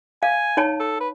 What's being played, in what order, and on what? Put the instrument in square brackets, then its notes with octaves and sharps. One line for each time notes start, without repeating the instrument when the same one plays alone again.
[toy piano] F5 [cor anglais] G#5
[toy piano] D#4 C#5 A5
[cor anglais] A4
B4